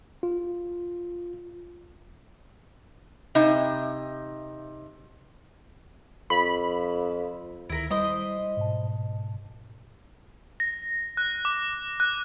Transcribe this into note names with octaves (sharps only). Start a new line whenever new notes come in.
F4
C3 D#4
F2 B5
D2 D#3 E4 A#4
G3 E4 C5 D#5 B5
G#2 B2 A5
A#6
F#6
D6
F#6